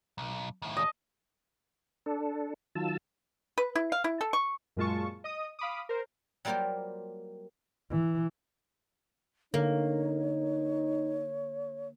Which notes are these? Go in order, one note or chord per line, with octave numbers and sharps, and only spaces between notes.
B1
D#2 A2
D#5 A5
D4 A4
D#3 F#3 F4 A5 E6
B4
E4
F5
E4
A4
C#6
F#2 A#2 G#3 F4 A5 C#6
D#5 D#6
F5 B5 D6 D#6
A#4 C5
F#3 G3 A#3 F4 G4 C5
E3
D3 A#3 D#4 C#5